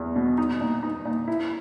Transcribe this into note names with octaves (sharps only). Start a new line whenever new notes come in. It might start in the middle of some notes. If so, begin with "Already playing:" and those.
Already playing: E2
B2
D#4
A#2
D#4
A#2
E4